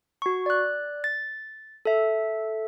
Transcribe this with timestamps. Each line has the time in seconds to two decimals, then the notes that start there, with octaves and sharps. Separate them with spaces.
0.22 F#4 C#6
0.46 D5 F#6
1.04 A6
1.85 A4 E5